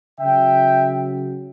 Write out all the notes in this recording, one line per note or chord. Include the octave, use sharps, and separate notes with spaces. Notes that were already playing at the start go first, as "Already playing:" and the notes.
C#3 F#3 C#4 E5 G5